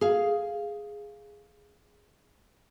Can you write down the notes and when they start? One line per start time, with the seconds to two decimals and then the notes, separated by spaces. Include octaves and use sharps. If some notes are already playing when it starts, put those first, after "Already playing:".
0.01 G#4 F5